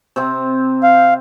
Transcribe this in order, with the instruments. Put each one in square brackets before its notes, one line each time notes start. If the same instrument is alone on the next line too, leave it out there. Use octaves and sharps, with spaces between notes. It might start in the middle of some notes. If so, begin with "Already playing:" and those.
[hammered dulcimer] C3 C4
[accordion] F5